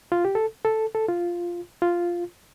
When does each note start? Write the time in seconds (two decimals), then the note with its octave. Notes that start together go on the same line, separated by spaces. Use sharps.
0.12 F4
0.25 G4
0.35 A4
0.65 A4
0.95 A4
1.09 F4
1.82 F4